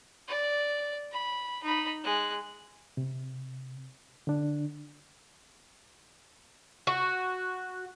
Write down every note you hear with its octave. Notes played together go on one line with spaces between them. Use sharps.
D5
B5
D#4 B5
G#3 F#6
C3
D3 D4
F#4